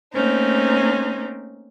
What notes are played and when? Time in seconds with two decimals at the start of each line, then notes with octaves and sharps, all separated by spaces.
0.14 A3 A#3 C4 C#4 D#4 C5